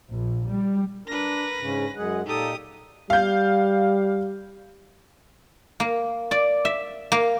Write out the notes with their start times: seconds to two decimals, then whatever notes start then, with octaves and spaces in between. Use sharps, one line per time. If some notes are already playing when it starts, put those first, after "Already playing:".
0.11 A#1
0.50 G3
1.07 D4 A#4 B4 A#6
1.60 G#2 C#3 C#4
1.95 F#2 G#3 G#4 F#5
2.26 A#2 D#4 G4 A4 D#6
3.10 G3 F5 G6
5.80 A#3
6.31 D5
6.65 E5
7.12 A#3